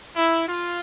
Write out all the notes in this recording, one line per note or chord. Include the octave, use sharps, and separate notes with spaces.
E4
F4